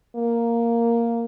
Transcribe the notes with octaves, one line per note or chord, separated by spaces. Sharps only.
A#3